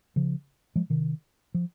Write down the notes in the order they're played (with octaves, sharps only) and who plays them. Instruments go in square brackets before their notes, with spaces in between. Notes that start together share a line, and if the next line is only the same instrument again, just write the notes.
[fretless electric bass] C#3 F3
F3 G#3
C3 D#3
F3